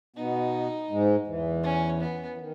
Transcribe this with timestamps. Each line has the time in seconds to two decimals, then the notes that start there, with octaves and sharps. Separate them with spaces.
0.16 B2 B3 D#4
0.90 G#2 G#3
1.27 E2 E3
1.64 C#4
2.01 B3
2.33 E3
2.38 D#3